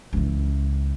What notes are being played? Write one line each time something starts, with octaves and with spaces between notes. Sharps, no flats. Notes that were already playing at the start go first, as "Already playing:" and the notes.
C#2 E3